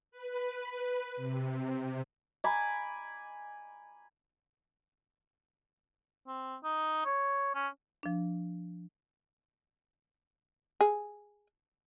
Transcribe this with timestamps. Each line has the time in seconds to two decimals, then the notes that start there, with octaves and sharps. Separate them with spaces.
0.11 B4
1.16 C3
2.44 G#5 A#5 B5 D6
6.28 C4
6.64 D#4
7.05 C#5
7.55 C#4
8.03 F3 D4
10.81 G#4